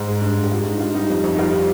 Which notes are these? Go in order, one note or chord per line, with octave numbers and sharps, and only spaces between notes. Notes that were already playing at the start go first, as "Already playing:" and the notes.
Already playing: G#2
G#3
G2
G2
G4
G#3 F4
G2 D#4
G2 F4
G3 D#4
F2
F2
D#4
G3 F4